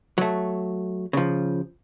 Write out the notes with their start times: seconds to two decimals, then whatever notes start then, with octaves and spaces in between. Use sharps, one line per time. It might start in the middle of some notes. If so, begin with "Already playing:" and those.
0.18 F#3 A3
1.13 C#3 F3